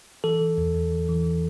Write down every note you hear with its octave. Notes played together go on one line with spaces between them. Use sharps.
E3 A4
E3
E2
E2
E3
E3